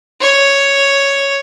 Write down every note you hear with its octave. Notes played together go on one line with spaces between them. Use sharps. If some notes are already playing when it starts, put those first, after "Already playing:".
C#5